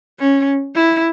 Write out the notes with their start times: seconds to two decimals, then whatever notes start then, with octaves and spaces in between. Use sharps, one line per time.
0.19 C#4
0.75 E4